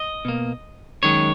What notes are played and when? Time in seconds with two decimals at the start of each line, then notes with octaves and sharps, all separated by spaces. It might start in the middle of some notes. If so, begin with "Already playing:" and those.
Already playing: D#5
0.25 B2 A#3
1.03 F#2 D#3 G#3 C#5